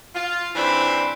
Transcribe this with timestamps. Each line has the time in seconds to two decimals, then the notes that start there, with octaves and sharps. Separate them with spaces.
0.15 F4
0.55 G#2 E3 C4 D4 C5 B5